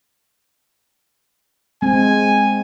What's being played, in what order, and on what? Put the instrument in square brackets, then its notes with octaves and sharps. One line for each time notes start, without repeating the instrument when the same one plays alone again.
[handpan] G#3 C4 [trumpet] G#5